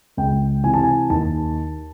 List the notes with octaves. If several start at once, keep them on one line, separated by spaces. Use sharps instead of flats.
C#2 G5
C3 E3 G#5
A5
G#5
D#2 A5